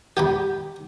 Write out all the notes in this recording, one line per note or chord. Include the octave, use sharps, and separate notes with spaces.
G4 G5 B5